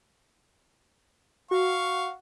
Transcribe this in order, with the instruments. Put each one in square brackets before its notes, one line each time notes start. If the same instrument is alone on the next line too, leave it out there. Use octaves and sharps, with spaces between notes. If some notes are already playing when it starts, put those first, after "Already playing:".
[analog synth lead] F#4 [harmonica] F5 C#6